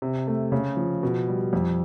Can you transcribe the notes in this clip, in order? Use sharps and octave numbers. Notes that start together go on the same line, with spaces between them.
C3
A3
C#3
F3
B2
G3
F2